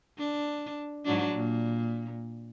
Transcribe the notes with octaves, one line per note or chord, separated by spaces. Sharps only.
D4
G#2 F#3 D4
A#2